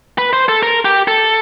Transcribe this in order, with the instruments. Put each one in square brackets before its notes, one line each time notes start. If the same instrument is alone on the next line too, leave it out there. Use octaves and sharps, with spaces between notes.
[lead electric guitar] B4
C5
A4
A#4
G4
A4